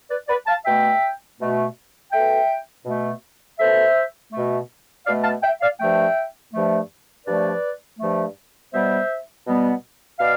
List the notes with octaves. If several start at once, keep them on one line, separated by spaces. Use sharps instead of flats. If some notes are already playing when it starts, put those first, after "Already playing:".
B4 D5
B4 D5
F5 A5
B2 A3 E5 G5
B2 A3
B2 A3 E5 G5
B2 A3
B2 A3 C5 E5
B2 A3
B2 A3 D5 F5
F5 A5
E5 G5
D5 F5
G2 F3 A3 E5 G5
G2 F3 A3
G2 F3 A3 B4 D5
G2 F3 A3
B2 G3 B3 C5 E5
B2 G3 B3
B2 D5 F5